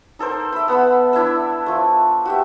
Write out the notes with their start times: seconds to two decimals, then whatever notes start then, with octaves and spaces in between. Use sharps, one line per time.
0.19 D#4 A4 A#4 C5
0.53 E5 B5
0.68 B3 F#5 B5 E6
1.13 D4 E4 E5 E6
1.66 F3 A3
2.25 F#4 G4 E5